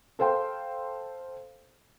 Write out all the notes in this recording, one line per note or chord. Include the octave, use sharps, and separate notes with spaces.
A4 C5 F5 G5 C6